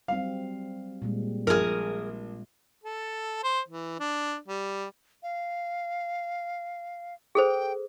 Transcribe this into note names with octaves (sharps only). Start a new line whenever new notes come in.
F#3 G3 C4 F5
A#2 G3 G#3
A#1 G#4 A#4 F6
A4
C5
E3
D4
G3
F5
G#4 A4 C5 G5